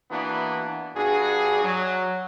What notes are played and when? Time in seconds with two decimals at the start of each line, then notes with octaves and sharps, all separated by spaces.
0.10 E3 A#3 B3 D4 F#4
0.96 G2 D4 F#4 G#4
1.63 F#3